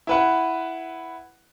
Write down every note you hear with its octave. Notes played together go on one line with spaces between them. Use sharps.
E4 B4 F#5